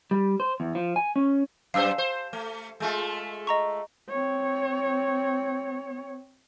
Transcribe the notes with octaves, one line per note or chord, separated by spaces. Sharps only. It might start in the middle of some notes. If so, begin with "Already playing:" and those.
G3
C5
E2
F3
G#5
C#4
F#2 G3 C5 F5 E6
C5
A3
G#3 A3 F4
D#5 A#5 C#6
C4 C#5